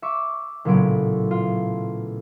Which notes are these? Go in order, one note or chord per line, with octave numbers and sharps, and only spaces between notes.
E5 C#6 D6
A1 A#2 C#3 F#3 B3 D7
F4